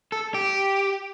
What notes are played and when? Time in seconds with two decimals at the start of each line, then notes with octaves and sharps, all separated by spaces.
0.12 A4
0.34 G4